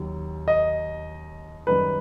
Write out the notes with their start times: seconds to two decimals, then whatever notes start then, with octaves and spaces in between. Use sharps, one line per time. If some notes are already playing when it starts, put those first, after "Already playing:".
Already playing: D#2 D#3 F#3
0.48 D#5
1.67 F#2 D#3 G3 D#4 B4